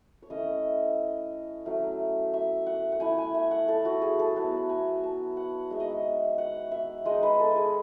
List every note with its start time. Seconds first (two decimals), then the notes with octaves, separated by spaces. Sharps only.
0.22 C#5
0.30 A3 C#4 E4 D#5
1.65 F#3 A3 C#4
2.34 E5
2.66 F#5
2.92 F#5
3.00 A3 E4 G#5
3.18 G#5
3.34 E5
3.51 F#5
3.68 A4
3.85 F#4
4.02 G#4
4.19 A4
4.36 F#3 B3 E4 B4
4.69 G#5
5.04 A5
5.37 F#5
5.71 G#3 D#4 E5
5.80 D#5
5.89 E5
6.38 F#5
6.71 E5
7.05 G#3 D#4 D#5
7.23 B4
7.39 A4
7.56 G#4